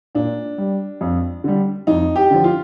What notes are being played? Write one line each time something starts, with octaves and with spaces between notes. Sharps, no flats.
A#2 D4
G3
F2
D3 G3
F2 D#4
G4
D3 F3
F4